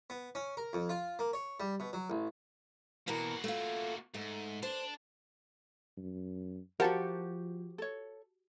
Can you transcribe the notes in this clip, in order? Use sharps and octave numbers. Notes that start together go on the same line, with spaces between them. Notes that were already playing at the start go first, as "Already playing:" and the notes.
B3
C#4
A#4
F2
F4
A#3
C#5
G3
B2
F#3
A1
B2 E3 A#3 F#4 A#4
A3 F4
G#2 A3
D4 C5
F#2
F3 F#4 G4 A#4 C5 F5 F#5 A5
A4 C#5